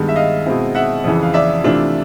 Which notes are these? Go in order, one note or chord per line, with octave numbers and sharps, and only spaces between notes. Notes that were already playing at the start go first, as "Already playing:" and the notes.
Already playing: G2 D#3 G#3 B3
E5
D#5 F5
B2 G#3 C4 E4
E5 F#5
F2 C#3 E3
F5
D5 E5
C3 E3 A3 D4 F4